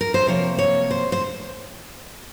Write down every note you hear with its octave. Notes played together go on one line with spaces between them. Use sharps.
A#4
C5
C3 F3 A#3 C#5
C#5
C5
C5